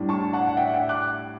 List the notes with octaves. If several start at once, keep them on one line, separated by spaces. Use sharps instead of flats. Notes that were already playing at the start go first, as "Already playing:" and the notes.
Already playing: A2 G3 D4
A5 C#6
F#5 A5
F#5
E5 G5
F#5
E5 G5
D6 F#6